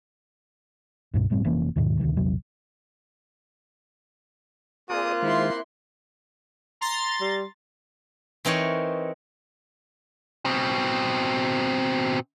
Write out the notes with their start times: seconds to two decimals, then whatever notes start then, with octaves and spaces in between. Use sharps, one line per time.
1.14 C2 G2 B2
1.30 F#1 A2 G3 C4
1.44 F1 E3 A#3 C#4
1.76 D#2 G#2 B2 D#3
1.99 D2 C3 D#3 E3
2.17 A#1 E2 C3 F#3
4.90 A#3 C4 F4 G#4 A#4 D5 D#6 F#6
5.22 D#3 G#3 E4 C5 C6
6.81 A#5 C6 A6
7.21 G3
8.45 E3 C4 D#4 A#4 C#5
10.45 B2 C4